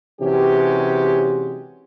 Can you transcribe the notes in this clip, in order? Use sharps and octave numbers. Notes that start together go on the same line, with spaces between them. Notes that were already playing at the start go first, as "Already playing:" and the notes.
C3 E3 F#3 G#3 C#4 G4